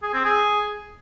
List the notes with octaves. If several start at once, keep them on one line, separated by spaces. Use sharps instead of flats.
G#4
C4
G#4